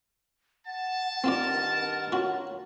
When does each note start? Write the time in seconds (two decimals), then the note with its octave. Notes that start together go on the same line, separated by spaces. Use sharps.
0.67 F#5 A5
1.24 G2 D#3 C4 F4 A#4 D5
2.12 F4 F#4 C#5